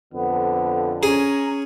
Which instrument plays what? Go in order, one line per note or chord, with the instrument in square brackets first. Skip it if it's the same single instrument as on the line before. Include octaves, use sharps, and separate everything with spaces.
[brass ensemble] F2 D3 [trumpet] B3
[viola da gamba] C#4 [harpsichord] G#4 [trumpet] A#5